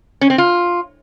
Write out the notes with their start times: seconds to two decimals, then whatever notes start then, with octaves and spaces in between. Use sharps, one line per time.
0.21 C#4
0.30 C4
0.38 F4